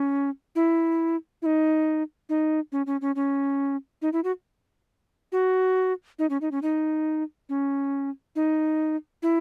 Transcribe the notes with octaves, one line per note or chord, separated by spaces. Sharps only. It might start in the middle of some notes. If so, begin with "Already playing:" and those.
Already playing: C#4
E4
E4
D#4
D#4
C#4
C#4
C#4
C#4
D#4
E4
F#4
F#4
D#4
C#4
D#4
C#4
D#4
C#4
D#4
E4